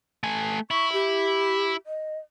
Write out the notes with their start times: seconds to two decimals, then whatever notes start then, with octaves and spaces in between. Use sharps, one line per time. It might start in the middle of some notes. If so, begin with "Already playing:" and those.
0.24 A3 G#5
0.71 E4 C#6
0.93 G4
1.86 D#5